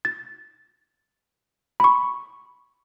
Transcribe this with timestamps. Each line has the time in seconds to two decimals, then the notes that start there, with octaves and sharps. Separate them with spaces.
0.05 A6
1.80 B5 C#6